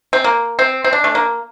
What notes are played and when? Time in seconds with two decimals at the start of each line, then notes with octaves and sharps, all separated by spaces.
0.13 C4
0.24 A#3
0.59 C4
0.84 C4
0.93 D4
1.04 A3
1.15 A#3